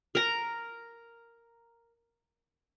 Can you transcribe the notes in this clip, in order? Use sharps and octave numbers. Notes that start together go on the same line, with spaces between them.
A#4 A#5